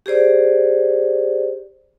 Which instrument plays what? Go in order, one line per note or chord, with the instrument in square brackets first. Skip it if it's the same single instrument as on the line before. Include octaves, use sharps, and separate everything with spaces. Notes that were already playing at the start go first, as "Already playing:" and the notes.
[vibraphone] G4 G#4 C5 D5